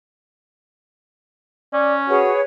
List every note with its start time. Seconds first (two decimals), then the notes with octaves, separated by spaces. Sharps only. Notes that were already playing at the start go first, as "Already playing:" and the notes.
1.73 C#4 D5
2.09 F#4 G#4 B4 C#5